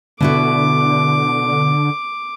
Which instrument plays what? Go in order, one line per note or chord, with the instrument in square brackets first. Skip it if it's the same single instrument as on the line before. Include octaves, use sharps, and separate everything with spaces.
[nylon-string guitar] B2 E4 F#4 [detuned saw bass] D3 [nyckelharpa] D6